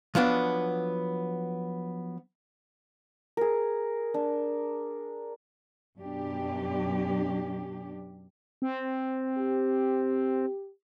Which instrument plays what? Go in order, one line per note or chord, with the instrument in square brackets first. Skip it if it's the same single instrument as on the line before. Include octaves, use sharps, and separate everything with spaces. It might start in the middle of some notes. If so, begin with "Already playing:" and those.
[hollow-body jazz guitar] F3 F#3 B3 D4
[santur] G#4 A#4
D4
[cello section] F#2 B2 D4 G4
[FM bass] C4
[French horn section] G4